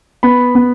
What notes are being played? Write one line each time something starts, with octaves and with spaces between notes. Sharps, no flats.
B3 B5
B3